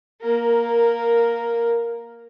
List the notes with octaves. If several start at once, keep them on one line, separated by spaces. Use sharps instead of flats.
A#3 A#4